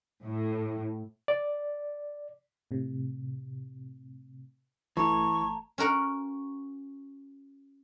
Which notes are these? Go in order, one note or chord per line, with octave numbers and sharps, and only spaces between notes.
A2
D5
A2 C3
G1 E3 A3 A5 A#5 C#6 G#6
C#4 F#4 A#4 F#5